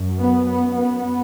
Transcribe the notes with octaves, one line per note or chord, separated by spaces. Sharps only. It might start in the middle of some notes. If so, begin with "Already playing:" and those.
Already playing: F#2
B3
B3
B3